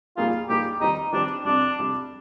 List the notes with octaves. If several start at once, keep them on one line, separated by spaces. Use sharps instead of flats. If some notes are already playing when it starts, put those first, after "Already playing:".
A#2 G3 A#3 D#4 F4 G#4
A#2 G3 A#3 D#4 G4 G#4
D#3 G3 C4 D#4 G4
D#3 G3 C4 D4 G4
F2 C3 G3 D4
F2 C3 G3